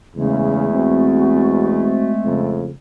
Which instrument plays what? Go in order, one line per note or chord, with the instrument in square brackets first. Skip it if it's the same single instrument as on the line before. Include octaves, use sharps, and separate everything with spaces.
[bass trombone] E2 [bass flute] C#3 [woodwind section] G#3 A3
[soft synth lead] C4 [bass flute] F#4
[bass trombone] F2 [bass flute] C#3